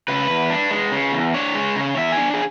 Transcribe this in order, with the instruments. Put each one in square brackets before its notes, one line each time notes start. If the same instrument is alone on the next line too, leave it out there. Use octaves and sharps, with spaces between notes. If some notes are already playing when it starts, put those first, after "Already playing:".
[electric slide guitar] C#3 B4
E2
D4
G#3
C#3
E2
D4 C#5
G#3
C#3
E2 E5
G#5
D4
G#4